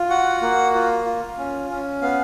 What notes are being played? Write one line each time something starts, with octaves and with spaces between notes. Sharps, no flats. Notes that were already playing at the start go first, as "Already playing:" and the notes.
Already playing: F4
F#4 F#5
A#3
F4
F4
C#4
C#4
B3 F5